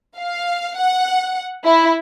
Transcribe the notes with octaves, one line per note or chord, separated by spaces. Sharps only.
F5
F#5
E4